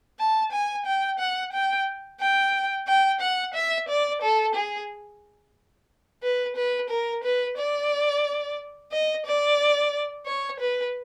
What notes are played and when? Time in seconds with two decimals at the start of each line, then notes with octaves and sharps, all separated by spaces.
0.19 A5
0.52 G#5
0.85 G5
1.19 F#5
1.52 G5
2.20 G5
2.87 G5
3.21 F#5
3.54 E5
3.88 D5
4.22 A4
4.55 G#4
6.23 B4
6.56 B4
6.90 A#4
7.24 B4
7.57 D5
8.91 D#5
9.26 D5
10.26 C#5
10.60 B4